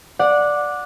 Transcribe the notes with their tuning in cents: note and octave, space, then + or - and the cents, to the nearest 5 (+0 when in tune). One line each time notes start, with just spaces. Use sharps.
D5 +5 F#5 -20